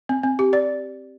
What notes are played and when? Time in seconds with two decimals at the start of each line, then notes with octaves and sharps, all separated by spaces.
0.09 C4
0.23 C4
0.39 G4
0.53 D5